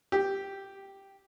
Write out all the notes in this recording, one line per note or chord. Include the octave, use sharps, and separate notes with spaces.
G4